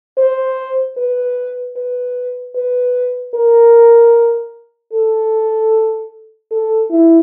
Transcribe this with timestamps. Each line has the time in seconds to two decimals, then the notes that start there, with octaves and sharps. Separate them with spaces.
0.18 C5
0.97 B4
1.77 B4
2.55 B4
3.35 A#4
4.93 A4
6.52 A4
6.90 E4